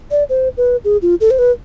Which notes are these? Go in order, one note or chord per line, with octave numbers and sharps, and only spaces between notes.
D5
C5
B4
G#4
F4
A4
C5
B4